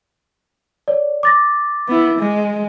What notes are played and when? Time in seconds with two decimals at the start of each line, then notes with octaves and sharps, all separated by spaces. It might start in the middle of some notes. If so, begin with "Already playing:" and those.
0.88 C#5 D5
1.23 D6 A6 A#6
1.88 B3 E4
2.19 G#3